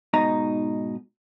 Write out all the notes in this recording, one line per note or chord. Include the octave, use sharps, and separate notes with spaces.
G#2 B2 D#4 A#5